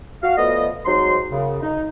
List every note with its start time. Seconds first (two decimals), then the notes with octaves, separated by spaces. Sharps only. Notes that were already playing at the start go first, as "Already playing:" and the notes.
0.23 F#4 F5
0.37 F3 A3 B3 D5 D#5
0.86 G#2 F#3 C4 D#4 C6
1.31 F#2 C#3
1.63 D#4